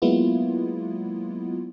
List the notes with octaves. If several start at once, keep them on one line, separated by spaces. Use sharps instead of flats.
F#3 G#3 A#3 B3 E4 F4